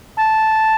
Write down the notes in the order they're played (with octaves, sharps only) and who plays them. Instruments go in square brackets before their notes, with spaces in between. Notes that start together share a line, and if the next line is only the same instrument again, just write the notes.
[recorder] A5